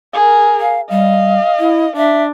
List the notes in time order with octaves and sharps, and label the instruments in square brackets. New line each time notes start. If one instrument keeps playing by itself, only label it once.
[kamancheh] G#4 A#4
[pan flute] F5
[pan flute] G3 [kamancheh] D#5 F5
[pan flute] E4
[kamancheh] D4 [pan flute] E5